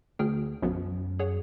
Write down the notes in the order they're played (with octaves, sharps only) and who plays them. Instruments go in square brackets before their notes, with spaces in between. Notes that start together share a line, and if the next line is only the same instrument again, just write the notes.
[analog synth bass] D2 [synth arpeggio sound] G#4 G5 F6
[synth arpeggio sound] B1 F3 B3 [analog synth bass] F#2
[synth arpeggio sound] G#4 C#5 F#5